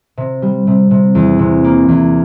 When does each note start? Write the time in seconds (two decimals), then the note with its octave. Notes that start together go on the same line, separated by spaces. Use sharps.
0.17 C3
0.42 G3
0.67 C3
0.91 C3
1.15 E2
1.39 C3
1.64 A#3
1.89 E2